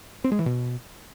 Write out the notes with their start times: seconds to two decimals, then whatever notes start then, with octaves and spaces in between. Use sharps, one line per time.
0.24 C4
0.32 G#3
0.39 E3
0.46 B2